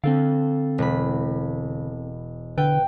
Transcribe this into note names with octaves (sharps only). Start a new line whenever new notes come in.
D3 C4 A4 F5
E1 B5
D3 B4 G5